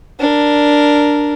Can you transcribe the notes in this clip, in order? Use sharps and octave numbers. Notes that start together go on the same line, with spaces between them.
D4 A#4